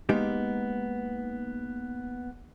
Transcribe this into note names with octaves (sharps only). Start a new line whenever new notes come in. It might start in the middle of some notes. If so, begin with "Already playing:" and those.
G#3 A#3 B3 D#4 G4